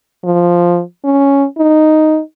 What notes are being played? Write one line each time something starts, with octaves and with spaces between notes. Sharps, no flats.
F3
C#4
D#4